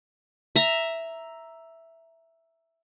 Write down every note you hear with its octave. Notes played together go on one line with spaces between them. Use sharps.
E5 A#5